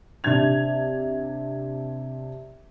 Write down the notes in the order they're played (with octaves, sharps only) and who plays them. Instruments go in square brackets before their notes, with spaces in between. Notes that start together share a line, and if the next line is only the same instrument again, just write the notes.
[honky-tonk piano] C3 D4 G#6 F7